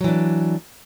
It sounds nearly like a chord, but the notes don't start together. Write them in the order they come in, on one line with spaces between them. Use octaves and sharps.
F#3 E3 D4